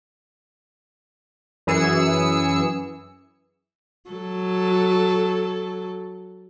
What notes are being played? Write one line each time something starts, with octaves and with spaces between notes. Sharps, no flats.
F#2 E3 G#4 E6 C#7
F#3 A4